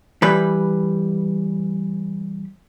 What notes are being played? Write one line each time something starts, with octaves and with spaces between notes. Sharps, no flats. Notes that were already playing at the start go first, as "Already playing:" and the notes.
E3 G3 B4